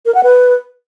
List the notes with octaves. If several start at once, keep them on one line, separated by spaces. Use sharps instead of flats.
A#4
F#5
B4